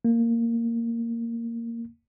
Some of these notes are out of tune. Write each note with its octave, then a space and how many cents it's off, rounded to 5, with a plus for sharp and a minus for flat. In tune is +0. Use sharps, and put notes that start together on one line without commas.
A#3 -10